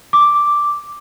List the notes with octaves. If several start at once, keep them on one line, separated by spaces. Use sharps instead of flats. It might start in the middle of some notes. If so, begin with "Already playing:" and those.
D6